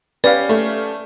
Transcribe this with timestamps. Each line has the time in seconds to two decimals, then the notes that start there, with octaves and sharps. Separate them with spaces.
0.24 C#4 G4 B4 D5 F5
0.49 A3